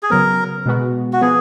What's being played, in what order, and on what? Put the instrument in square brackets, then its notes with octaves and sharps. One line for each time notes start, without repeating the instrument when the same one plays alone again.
[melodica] G#4
[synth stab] C#3 F#3 B3 [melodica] A#4
[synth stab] B2 G#3 B3 F#4
[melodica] F#4
[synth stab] F3 B3 [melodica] G#4